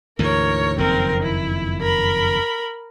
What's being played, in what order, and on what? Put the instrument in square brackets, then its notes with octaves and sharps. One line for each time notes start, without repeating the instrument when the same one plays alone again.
[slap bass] D2 G#2 E3 [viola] A#4 C#5
[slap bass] F#1 F2 D#3 [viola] C4 A#4
[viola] E4
A#4 B5